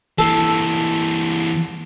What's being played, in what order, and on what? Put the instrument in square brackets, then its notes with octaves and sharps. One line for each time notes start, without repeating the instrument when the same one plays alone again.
[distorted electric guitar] E3 A#3 [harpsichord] A4